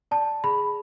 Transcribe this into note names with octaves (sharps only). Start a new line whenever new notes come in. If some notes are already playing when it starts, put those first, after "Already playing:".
D5 A5
G#4 B5